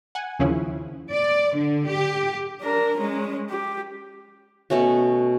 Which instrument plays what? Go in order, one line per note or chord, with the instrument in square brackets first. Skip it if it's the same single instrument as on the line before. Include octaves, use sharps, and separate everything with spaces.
[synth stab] F#5 G#5
D#2 C#3 F3 C#4 E4
[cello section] D5
D3
G4
[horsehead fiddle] D4 A#4
G#3 C#4
G4
[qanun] B2 A3 C#4 F#4